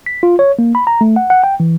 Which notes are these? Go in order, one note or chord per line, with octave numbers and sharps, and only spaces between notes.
B6
F4
C#5
A#3
B5
A#5
A3
F#5
F#5
G5
E3